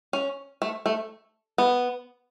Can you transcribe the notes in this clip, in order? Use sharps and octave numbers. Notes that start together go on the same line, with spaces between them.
C#4
A3
A3
B3